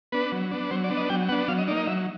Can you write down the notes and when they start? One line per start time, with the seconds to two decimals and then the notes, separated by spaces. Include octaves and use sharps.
0.12 B3 D4 B4
0.32 F#3
0.51 B3 D4
0.71 F#3 C5
0.84 D5
0.90 B3 D4
0.97 D#5
1.09 F#3 G5
1.29 B3 D4 F#5
1.48 F#3 F5
1.58 D#5
1.68 A#3 D#4 D5
1.77 D#5
1.87 F#3 E5